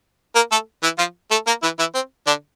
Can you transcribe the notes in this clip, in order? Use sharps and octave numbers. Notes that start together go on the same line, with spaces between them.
A#3 A#4
A3 A4
E3 E4
F3 F4
A3 A4
A#3 A#4
E3 E4
E3 E4
C4
D3 D4